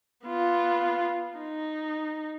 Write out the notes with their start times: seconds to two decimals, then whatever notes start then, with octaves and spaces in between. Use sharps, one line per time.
0.25 B3 F4
1.38 D#4